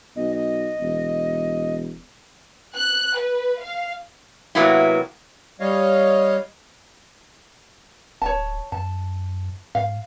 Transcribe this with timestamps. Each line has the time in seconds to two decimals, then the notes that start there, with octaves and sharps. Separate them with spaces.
0.16 B1 D#5
0.34 D#5
0.80 E1
2.76 F#6
3.18 B4
3.60 F5
4.55 C3 F#3 A#3 B3 E4
5.60 G3 C#5 D#5 F5
8.22 D1 C#5 A5
8.72 F#2 A5
9.75 G#2 F5